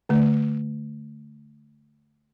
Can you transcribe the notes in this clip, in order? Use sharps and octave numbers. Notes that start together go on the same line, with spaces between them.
D3 A3